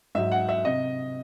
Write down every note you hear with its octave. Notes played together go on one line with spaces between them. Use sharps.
G#2 F#3 E5
F#5
E5
C3 D#5